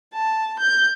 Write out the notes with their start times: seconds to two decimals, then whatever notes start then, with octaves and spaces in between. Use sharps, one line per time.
0.13 A5
0.59 G6